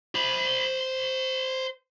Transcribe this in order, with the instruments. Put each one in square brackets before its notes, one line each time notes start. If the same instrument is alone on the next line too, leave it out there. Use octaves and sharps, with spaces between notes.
[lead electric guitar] C5 B5